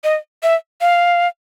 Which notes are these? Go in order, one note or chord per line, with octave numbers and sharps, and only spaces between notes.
D#5
E5
F5